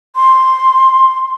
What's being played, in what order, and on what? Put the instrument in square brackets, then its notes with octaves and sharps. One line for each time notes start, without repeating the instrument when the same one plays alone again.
[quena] C6